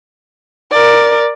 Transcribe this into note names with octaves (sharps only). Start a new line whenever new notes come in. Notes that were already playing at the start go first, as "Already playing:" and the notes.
A#4 D5